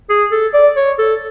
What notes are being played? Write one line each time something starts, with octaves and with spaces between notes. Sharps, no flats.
G#4
A4
D5
C#5
A4